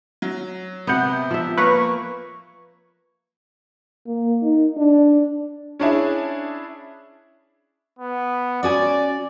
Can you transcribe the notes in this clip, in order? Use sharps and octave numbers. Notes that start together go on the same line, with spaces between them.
F#3
C3 B3 F#5 G6
F3 E5
A#3 A#4 B4 C#5 C#6
A#3
D#4
D4
C#4 D4 E4 G#4
B3
C#4 F#4 D5 G#5